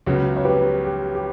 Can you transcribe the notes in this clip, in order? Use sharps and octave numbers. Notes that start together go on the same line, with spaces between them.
C#2 C#3 F#3 B3
C#5
G4 B4
G4
G4